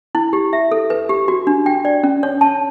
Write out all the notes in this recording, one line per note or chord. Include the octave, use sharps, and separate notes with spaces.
E4
G4
E5
A4
B4
G4
F#4
D4
G5
D5
C#4
C#5
A5